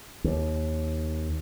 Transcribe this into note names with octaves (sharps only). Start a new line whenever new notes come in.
D#2